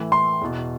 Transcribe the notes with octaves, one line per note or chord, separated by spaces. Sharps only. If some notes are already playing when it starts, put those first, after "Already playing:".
Already playing: A2 E3
C6
E2 B2